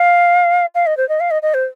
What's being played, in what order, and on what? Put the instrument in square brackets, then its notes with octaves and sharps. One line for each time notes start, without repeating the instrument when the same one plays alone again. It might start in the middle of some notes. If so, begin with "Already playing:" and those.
Already playing: [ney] F5
F5
D#5
C5
D#5
F5
D#5
D#5
C5